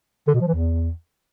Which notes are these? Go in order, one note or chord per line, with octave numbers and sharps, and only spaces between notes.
D3
B2
F3
E3
E2